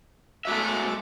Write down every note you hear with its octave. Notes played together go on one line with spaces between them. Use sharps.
G#3 A3 F#4 E5 D6